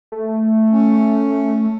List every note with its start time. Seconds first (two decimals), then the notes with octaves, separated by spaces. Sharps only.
0.12 A3
0.70 C#4